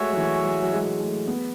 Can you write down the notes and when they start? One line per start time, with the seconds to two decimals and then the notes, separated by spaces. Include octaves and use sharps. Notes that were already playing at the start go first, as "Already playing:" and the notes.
Already playing: G#3 A3 F#4 C#5 E5 G#5
0.13 F#3
0.17 E3
0.45 F#3
0.62 F#3
0.73 G#3
1.00 A3
1.27 B3